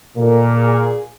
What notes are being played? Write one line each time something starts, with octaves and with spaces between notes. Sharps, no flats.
D#2 A#2 A4
G#4